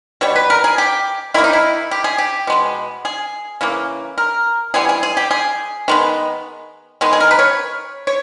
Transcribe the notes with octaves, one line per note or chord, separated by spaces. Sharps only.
B2 G3 C#5
B4
A#4
G#4
G4
D#3 A#3 E4
D#4
E4
G4
G#4
G4
B2 G#3 B3
G#4
C#3 E3 A#3
A#4
E3 G3 B3 G#4
G#4
G#4
G4
G#4
D#3 G#3 B3
D#3 G#3 B3 G#4
G#4
A#4
B4
C#5
C#5